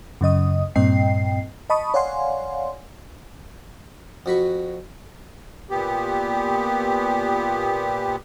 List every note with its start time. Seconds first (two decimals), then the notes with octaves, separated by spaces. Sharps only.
0.21 F#2 C#3 D#5 D#6
0.76 G2 A#2 C4 D#5 G5 C7
1.70 D#5 A5 B5 C#6 D#6
1.94 C#5 D5 F5 F#5 G#5 C6
4.26 F2 F#4 B5 C#6
5.70 A#2 B3 G4